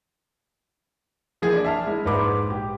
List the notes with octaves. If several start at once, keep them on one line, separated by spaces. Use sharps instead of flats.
E3 F3 A#3 G#4
D4 D5
E5 A5 F6
G#3 E4
A#1 G#2 B4 D6
G4